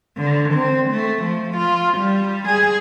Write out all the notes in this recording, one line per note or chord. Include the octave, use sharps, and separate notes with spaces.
D3
C4
A3
F3
F4
G3
G#4